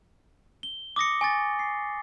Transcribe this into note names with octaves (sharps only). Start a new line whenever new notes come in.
G7
D6 D#6 A#6 C#7
G#5 C#6 A6
C7